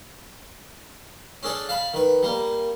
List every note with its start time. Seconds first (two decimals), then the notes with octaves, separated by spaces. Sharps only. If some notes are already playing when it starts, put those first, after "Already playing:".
1.43 C#4 D4 G#4 A4 D5
1.69 F5 A5 B5
1.94 D#3 B4
2.23 G3 A#3